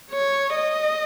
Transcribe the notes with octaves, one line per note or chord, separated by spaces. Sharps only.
C#5
D#5